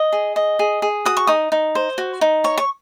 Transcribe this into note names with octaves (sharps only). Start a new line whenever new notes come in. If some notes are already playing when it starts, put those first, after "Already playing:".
Already playing: D#5 D#6
G#4
D#5
G#4
G#4
F#4 D#6
C#6
D#4 D#6
D#4
C5
F#4
D#4
C#5 C#6
C#6